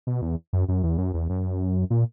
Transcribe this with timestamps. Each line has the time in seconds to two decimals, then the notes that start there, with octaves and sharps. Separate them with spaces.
0.07 B2
0.22 E2
0.53 F#2
0.68 F#2
0.83 E2
0.98 F#2
1.14 E2
1.29 F#2
1.90 A#2